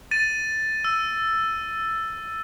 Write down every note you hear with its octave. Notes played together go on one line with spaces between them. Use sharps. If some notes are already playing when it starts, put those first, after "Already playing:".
A6 D#7
E6